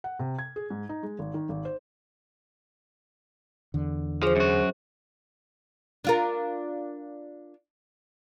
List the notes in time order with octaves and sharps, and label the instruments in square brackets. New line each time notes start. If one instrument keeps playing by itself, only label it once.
[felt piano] F#5
C3
G#6
G#4
G#2
D#4
G#3
G#1
D#3
G#1
C5
[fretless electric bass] E2 D3
[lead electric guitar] F3 [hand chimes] G#4 C5
[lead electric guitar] F#2 F#4
[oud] D4 F4 A#4